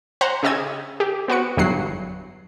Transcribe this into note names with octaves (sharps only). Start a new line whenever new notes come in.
C5 F#5 A#5 C6
C#3 G4 D#5 E6 G#6
G4
B3 F#4 B4 C#7
G1 E2 G2 F#3 F#5 C7